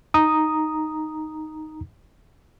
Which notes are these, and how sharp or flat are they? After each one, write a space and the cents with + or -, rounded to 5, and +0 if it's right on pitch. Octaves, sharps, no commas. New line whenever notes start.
D#4 +0 A#5 +0 D#6 +0